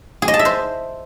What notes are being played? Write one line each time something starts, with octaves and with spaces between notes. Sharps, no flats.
G#4
D#5
A5
E5
C5